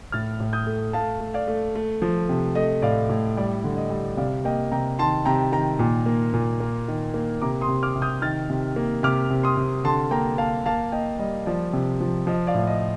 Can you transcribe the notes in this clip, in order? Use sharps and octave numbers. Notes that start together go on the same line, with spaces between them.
A2 F6 A6
A2
D#6 G6
A3
A3 F5 A5
A3
D5 F5
A3
A3
F3
C3
A3 D#5
A2 D5 F5
A2
G3 D5
D3
D#5
G3
C3 D5 F5
A#3 D#5 G5
C3 G5 A#5
D#3 A5 C6
C3 G5 A#5
D#3 G5 A#5
A#2
A#3
A#2
A#3
D#3
A#3
C3 A#5 D6
C6 D#6
C3
D6 F6
C3
D#6 G6
D#3 F6 A6
C3
A#3
C3 D6 F6
C3
C6 D#6
C3
D3 A5 C6
A#3 G5 A#5
A#3 F5 A5
A#3 F5 A5
A#3 D#5 G5
G3 D#5
F3 D5
C3
F3
F3 D#5
D5 F5
A2
D#5